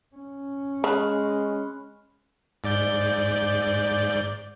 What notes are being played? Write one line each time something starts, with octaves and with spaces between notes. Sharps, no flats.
C#4
C#3 G#3 B5 F6 F#6
G#2 D5 G6